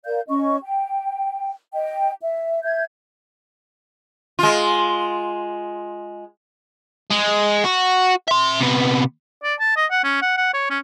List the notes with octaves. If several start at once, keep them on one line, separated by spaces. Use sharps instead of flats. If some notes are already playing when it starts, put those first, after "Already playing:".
A#4 D5 F5 G6
C#4 D#5 C#6
G5
D#5 G5
E5
E5 G6 G#6
G#3 F4
G#3
F#4
E5 C6
C3 B3
D5
A5
D#5
F#5
C#4
F#5
F#5
C#5
C#4